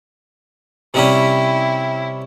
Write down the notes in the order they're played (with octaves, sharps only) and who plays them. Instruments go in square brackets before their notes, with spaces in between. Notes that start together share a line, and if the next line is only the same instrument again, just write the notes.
[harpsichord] C3 G3 C#4 [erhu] E4